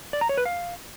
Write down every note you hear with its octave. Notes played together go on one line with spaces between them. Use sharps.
D5
A#5
C#5
B4
F5